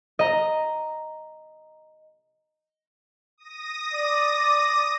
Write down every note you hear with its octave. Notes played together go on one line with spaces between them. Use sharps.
D#5 A#5
D#6 A#6
D5